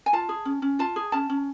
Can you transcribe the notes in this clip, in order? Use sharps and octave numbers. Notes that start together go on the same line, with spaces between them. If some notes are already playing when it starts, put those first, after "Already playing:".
G#5
F4 A5
G#4
C#4
C#4
F4 A5
G#4
C#4 A5
C#4